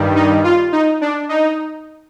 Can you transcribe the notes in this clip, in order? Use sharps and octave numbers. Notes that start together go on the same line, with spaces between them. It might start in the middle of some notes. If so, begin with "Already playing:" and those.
Already playing: G2 D#3 G3
D#4
F4
D#4
D4
D#4